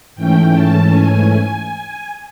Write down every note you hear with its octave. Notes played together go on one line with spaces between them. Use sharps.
G#2 E3 A3 C#4 G5
A5
G#5